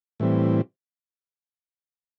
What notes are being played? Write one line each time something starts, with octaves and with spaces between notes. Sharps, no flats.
A2 E3 G3 C4